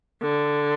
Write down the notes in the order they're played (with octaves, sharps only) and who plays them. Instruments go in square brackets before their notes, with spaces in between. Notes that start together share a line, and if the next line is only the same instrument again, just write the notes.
[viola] D3